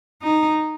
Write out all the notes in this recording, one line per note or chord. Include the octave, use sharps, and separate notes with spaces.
D#4